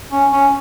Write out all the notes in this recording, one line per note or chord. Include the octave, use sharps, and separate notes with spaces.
C#4
C#4